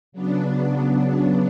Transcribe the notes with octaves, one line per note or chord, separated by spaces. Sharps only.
C#3 F#3 B3 D4